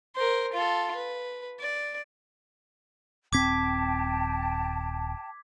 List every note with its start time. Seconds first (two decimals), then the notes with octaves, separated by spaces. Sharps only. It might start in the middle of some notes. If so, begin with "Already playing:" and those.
0.16 A#4 C5
0.53 F4 A4
0.95 B4
1.60 D5
3.33 D#1 C4 G5 A5 D6 G#6 B6